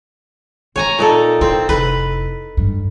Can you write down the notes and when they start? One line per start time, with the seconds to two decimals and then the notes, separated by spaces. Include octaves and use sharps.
0.76 C4 C#5 G#5 A#5
0.99 A#2 D#4 A4
1.41 C4 E4
1.69 F1 E4 B4
2.57 G2 F#3